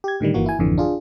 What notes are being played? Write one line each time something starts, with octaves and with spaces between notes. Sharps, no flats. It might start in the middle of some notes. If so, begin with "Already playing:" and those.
G4 G#6
A2 D3 D#3 G3
G1 E3 A#3 F#4
E4 G#5
G#1 F2 D3 E3
D4 F4 G#4